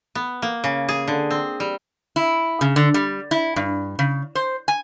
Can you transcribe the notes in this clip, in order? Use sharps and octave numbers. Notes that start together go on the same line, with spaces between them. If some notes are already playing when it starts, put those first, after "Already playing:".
B3
A#3
C#3
G#4
D3
C4
G3
E4
C#3
D3
G3
E4
G2
C#3
C5
G#5